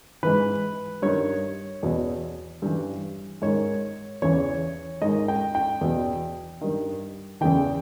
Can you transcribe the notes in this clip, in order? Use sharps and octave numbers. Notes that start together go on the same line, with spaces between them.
G#2 E3 B4
G2 D#3 C#5
E2 B2
G2 E3
G#2 D#3 C#5
E2 C#3 E3 C#5
G#2 D#3 D#5
G5
G5
E2 B2
G2 D#3
E2 C#3 E3 G5